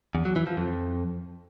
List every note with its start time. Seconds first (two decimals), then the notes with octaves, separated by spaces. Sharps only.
0.15 E2
0.25 F#3
0.36 E3
0.47 F3
0.57 F2